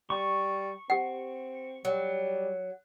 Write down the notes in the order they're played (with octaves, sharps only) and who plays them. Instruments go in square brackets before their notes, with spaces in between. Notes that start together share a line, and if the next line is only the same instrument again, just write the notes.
[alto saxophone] G3 [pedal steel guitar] C#6
[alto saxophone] C4 [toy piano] G4 F#5
[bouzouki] F#3 [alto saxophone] G3